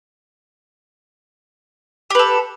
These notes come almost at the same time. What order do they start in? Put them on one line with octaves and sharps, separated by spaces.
G4 B4 A4